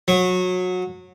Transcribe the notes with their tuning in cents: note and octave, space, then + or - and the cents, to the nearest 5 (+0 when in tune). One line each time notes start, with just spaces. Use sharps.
F#3 -25